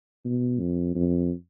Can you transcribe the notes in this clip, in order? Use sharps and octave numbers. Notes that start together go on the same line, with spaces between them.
B2
F2
F2